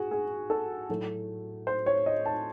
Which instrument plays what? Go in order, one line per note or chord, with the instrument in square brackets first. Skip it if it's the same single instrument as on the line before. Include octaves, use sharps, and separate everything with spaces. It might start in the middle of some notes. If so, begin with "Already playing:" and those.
Already playing: [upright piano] G#2 F#4 G#4
G#4
A4
A2 F#3 A3
C5
C#5
D#5
A5